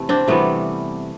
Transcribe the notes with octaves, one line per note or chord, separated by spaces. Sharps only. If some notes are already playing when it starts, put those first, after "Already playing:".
Already playing: C3 E3 A3
C4 D4
C3 E3 G3 A3 B3